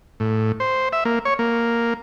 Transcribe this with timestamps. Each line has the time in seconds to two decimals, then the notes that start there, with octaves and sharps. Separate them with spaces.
0.20 A2
0.60 C5
0.93 E5
1.05 A#3
1.25 C#5
1.39 A#3